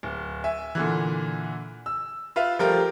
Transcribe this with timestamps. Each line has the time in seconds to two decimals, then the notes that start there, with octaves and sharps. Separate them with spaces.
0.03 D1
0.44 E5 G#5
0.75 A#2 D3 E3
1.86 E6
2.36 F4 B4 E5 F5
2.59 F3 G3 A3 F4 G4 A#4